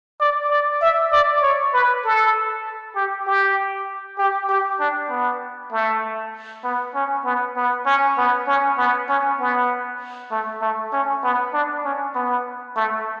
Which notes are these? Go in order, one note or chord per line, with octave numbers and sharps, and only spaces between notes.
D5
D5
E5
D5
C#5
B4
A4
G4
G4
G4
G4
D4
B3
A3
B3
C#4
B3
B3
C#4
B3
C#4
B3
C#4
B3
A3
A3
C#4
B3
D4
C#4
B3
A3